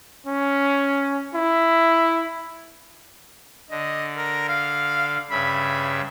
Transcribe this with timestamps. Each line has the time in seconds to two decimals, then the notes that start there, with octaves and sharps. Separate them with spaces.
0.26 C#4
1.35 E4
3.70 D3 D#5
4.17 A#4
4.48 F5
5.31 G2 C#3 E5 B5